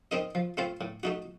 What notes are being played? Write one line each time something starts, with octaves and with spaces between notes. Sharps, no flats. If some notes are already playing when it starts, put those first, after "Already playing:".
C4 D#4 A#4 D#5
F3
A3 C4 F4 C5
A2
A3 D#4 F#4